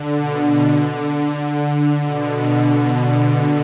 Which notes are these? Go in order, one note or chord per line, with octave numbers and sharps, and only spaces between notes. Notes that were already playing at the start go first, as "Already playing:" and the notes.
Already playing: D3
B2
D3
B2